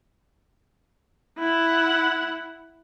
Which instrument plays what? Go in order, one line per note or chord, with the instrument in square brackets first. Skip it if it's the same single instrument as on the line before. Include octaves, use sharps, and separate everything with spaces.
[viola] E4 F#5